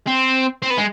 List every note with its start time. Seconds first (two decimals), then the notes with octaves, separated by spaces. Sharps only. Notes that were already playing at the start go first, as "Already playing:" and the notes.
0.08 C4
0.62 C4
0.70 B3
0.78 G#3